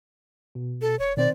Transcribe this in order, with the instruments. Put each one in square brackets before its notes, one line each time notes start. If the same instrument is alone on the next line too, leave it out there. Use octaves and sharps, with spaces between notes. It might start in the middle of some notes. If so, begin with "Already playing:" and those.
[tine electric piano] B2
[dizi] A4
[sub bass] E1 [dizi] C#5
[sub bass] B2 [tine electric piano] D#3 C4 C5 [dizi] D5